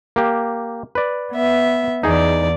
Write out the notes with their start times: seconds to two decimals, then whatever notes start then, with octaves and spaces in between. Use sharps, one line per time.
0.16 A#3 G4
0.95 B4 D5
1.33 B3 E5
2.03 E2 D#4 G#4 D5